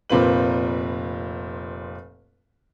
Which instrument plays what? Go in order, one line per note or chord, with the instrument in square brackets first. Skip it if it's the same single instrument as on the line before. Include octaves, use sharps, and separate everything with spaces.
[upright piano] F1 A#2 C4 F4 B4 F#7